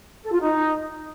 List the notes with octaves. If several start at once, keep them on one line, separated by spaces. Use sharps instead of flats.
A4
F4
D#4